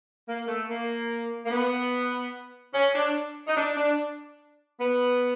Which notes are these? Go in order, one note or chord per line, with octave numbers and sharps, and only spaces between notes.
A#3
A3
A#3
A#3
B3
C#4
D4
D#4
D4
D4
B3